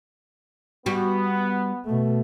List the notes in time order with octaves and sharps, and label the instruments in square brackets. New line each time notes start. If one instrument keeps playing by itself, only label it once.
[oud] G3 F#4 [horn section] B3
[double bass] B2 A3